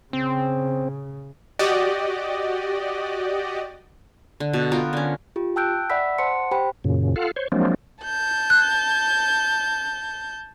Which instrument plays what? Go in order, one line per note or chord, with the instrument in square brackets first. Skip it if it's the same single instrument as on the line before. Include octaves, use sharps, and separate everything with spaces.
[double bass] C#3 [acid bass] C4
[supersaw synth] F#4 G4 D5 D#5
[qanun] D3
B2 A4
B3 F4 A#4 G5
D3 C#4
[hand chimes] F4 G4
G5 A5 E6 F#6 G6 D7
D5 E5 F#5 B5 E6 B6
C5 F#5 A5 C6 C#7
G4 C5 G5 B5
[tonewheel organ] F#2 A#2 C#3
F4 A4 F5 F#5
C5 C#5
F3 F#3 G#3 A#3 C4 D4
[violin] A5 G6
[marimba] F#6